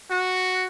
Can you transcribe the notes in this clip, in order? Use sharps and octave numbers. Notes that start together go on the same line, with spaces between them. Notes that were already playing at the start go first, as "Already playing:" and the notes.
F#4